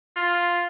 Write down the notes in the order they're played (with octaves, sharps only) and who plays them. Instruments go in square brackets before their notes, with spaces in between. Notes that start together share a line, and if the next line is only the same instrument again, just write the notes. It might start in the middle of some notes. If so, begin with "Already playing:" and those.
[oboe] F4